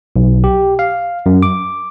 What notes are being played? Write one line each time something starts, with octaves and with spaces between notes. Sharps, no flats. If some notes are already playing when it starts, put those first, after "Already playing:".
B1
G4
F5
F#2
D6